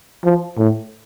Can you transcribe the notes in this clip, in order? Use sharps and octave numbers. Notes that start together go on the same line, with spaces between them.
F3
A2